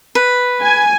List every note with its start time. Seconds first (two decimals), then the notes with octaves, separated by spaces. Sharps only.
0.15 B4
0.62 G#5